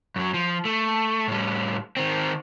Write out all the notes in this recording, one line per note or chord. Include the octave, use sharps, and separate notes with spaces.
F#2 F#3
F3
A3
A2 G3
D#3 C4